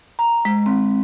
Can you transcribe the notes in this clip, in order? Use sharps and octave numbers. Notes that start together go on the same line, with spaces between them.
A#5
G#3
C4